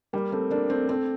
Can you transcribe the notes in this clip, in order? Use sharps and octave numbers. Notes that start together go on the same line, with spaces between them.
G3 A#3
A3 C4
A#3 D4
A3 C4
A3 C4